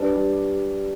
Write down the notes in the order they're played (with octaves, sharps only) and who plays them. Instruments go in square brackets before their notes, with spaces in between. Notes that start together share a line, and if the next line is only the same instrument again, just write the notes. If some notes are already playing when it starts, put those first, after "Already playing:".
Already playing: [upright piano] G3 D4 [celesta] B4
[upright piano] G3